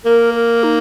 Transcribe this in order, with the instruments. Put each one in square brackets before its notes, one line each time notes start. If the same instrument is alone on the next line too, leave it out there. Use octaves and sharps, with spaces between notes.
[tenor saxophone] A#3 [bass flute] A#4
[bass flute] A#4
D#4